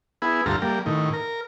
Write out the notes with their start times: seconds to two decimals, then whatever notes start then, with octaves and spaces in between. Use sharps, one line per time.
0.22 B3 E4 G#4
0.46 D2 G2 F4 A4 A#5
0.62 G3 A#3
0.86 A2 D#3
1.13 A#4